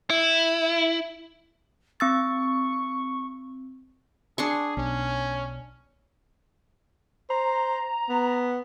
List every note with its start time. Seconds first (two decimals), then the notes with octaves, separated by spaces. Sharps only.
0.10 E4
2.00 C4 C#6 E6 A6
4.38 D4 G#4 C6 C#6
4.77 B1 C#4
7.30 C5 A#5
8.09 B3